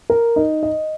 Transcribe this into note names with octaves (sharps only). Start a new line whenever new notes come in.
A#4
D#4
D#5